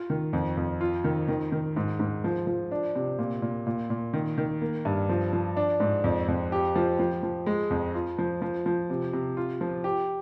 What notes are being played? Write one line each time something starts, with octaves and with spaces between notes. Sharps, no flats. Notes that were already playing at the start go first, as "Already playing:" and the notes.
Already playing: F4
D#3
F2
F2
F4
D#3
D#3
D#3
G#2
G#2
F3
F3
D4
C3
A#2
A#2
A#2
A#2
D#3
D#3
A#3
G2
F3
F3
D4
G#2
F2
F2
G4
F3
F3
F3
G#3
F2
F4
F3
F3
F3
C3
C3
F4
F3
G4